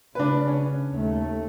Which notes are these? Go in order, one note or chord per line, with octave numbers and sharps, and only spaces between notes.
C#3 D4 B4
C#4
D#2 A3